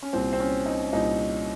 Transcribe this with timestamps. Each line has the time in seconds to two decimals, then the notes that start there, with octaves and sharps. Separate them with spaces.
0.03 C#4
0.13 C2 A#2 C4
0.33 C4
0.40 C#4
0.66 D#4
0.92 C2 A#2 D#4